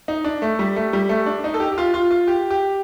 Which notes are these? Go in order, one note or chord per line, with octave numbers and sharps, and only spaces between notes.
D#4
D4
A3
G3
A3
G3
A3
D4
D#4
A4
G4
G4
F4
F4
F4
G4
G4